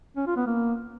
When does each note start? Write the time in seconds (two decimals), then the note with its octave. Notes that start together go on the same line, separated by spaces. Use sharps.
0.17 C#4
0.26 F4
0.36 B3
0.46 A#3